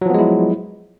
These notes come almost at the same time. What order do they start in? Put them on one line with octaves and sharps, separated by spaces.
F#3 F3 B3 G#3 E4